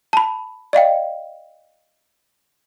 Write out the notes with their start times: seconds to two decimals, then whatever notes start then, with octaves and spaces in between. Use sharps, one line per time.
0.13 A5 B5
0.73 D5 D#5 F5 G5